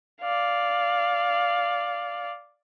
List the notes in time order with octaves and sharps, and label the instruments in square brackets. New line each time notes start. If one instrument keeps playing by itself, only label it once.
[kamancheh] D5 F5